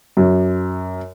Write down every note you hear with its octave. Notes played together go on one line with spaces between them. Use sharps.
F#2